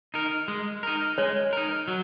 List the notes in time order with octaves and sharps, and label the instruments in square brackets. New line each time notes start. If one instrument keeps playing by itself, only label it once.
[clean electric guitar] D#4 A#4
G#3
D#4 A#4
[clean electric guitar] G#3 [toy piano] C#5
[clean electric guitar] D#4 A#4
F#3